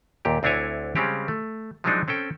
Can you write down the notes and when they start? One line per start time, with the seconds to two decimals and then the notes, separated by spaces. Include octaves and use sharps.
0.25 D#2 A#2 G4
0.43 D2 C4 D4 E4 C#5 G#5
0.96 C#3 G3 G#3 C4 C#4 G4
1.28 A3
1.84 F3 F#3 G#3 C4 D4 D#4
2.08 C4 C#4 A4 G5